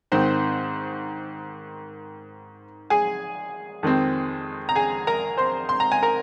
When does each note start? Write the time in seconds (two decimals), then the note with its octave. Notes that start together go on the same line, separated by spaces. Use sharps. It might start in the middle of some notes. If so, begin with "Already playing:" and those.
0.12 G#2 D#3 C4 C5 C6
2.90 G#4 G#5
3.83 F2 D#3 G#3 C4
4.69 A#5
4.75 G#4 G#5
5.07 A#4 A#5
5.37 C5 C6
5.69 C6
5.80 A#5
5.92 G#5
6.03 A#4 A#5